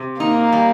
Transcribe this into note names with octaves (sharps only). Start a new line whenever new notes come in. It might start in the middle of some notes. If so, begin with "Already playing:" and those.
Already playing: C3
A#3 D#4
G3